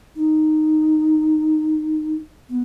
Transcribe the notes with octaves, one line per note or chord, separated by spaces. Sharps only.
D#4
B3